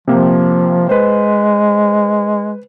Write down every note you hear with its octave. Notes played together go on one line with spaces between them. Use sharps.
C3 F3 A#3 G5
G#3 B4 C5